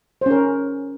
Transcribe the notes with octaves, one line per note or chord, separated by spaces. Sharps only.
C#4 A#4 C5